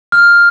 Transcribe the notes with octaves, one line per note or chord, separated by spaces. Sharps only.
F6